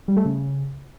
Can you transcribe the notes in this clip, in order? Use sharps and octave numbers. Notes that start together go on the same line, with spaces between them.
G3
A3
C#3